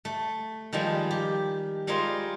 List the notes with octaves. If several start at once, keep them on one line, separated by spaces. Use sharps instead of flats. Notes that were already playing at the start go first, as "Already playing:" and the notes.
A3
D#3 F3 G3 G#3
G4
G3 G#3 F4 G#4 A#4 C5